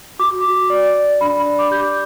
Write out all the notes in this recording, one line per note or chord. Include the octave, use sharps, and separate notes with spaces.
F#4 D6
F#4
D5
D5
D4 B5
B5
D5 B5
D6
G4 G6